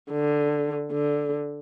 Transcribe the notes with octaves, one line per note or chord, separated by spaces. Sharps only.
D3
D3